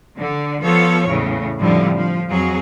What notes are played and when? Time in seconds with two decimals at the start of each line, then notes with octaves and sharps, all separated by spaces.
0.18 D3
0.61 F3 B3 A4 C#5
1.06 E2 A2 C#3
1.59 F2 A2 D3 F3 G3
1.95 F3
2.27 F2 F#3 G#4